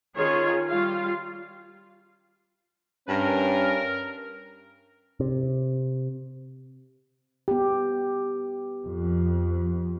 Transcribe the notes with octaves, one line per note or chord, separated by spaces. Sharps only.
D#3 C#4 F4 G#4 C#5
G3 F4 F5
G2 C#4 A#4
C3
B3 G4
F2